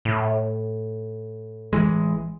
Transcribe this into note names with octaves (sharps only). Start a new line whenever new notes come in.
A2
A1 E3 G#3